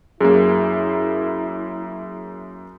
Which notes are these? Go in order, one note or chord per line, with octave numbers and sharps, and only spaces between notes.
F#2 A#3 E4 G#4